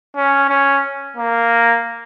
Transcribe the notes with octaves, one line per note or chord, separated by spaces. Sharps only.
C#4
C#4
A#3